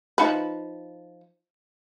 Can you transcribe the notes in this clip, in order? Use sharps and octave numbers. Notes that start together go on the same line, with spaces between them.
F3 D#4 B4